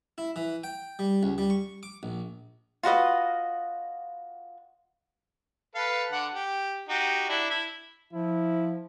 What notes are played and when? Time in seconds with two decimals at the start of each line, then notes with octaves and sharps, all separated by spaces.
0.18 E4
0.36 E3
0.64 G5
0.99 G3
1.23 C#2
1.38 G3
1.50 C#6
1.83 D6
2.03 A#1
2.83 F4 F#4 B4 D#5
5.75 A4 B4 F5
6.12 D3 F#5
6.33 G4
6.89 D#4 F#4 G4
7.29 D4 E4
7.50 E4
8.13 F3 E4